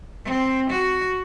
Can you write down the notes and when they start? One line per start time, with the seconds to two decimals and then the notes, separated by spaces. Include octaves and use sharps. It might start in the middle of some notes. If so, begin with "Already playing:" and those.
0.25 C4
0.71 F#4